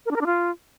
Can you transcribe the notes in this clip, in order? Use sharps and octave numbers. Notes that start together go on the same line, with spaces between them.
A#4
D4
A#4
D4
F4